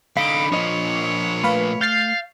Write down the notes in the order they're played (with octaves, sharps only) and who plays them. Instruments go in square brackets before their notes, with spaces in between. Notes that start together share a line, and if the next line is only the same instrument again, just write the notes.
[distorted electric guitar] D3 D#4 [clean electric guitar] F5 [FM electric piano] B5 [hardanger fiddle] D6
[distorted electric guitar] A#2 F3 [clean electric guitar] D4 D#5 [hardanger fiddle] C#5
[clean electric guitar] A3 [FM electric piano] B4 F5 B5
[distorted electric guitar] F5 [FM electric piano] G6 A6 C7